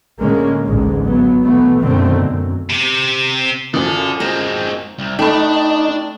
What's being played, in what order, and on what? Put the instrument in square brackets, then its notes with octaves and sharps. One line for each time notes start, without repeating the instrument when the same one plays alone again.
[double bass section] A2 D3 G#3 A#3 C#4
A1 D2 G#2 D3 G#3
F#3 B3
B2 E3 A3 B3
F#2 B2 D3 D#3 A3 C4
F#2
[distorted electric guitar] C3
[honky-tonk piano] F#2 F3 [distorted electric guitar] A4 D5
[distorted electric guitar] G#3 C4 [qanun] A#5
[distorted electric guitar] C2
[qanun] A3 C#6 [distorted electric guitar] D4 [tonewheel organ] D#4 [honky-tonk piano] G5 B5